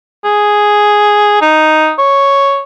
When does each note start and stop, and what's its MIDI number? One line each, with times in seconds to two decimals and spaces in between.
0.25 1.41 68
1.42 1.93 63
1.99 2.62 73